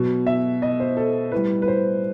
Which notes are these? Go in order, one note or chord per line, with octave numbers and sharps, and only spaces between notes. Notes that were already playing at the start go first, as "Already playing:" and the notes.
Already playing: B2 F#3
E5
D#5
C5
A4
A2 G3 B4
B4
C5